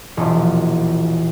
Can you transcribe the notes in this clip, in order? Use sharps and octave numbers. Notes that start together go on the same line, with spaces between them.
E1 A#1 F3